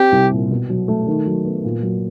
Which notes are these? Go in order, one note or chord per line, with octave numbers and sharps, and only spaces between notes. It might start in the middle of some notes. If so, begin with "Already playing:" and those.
Already playing: C4 G4
C2
A#2
B2
F#3
A3
D#3
F#3
B3
A#2
F#3